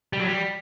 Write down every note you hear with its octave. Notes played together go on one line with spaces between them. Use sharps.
G3
F#3
G3